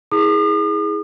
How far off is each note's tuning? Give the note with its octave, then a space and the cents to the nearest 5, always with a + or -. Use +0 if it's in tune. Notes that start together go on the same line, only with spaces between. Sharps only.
E4 -30 G#4 +0 D#6 -45